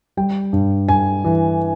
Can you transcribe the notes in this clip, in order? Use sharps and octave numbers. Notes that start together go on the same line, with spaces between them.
G3 G5
G2
G2 G#5
E3